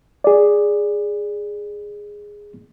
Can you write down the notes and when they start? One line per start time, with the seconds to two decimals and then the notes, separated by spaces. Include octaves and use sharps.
0.24 G#4 D5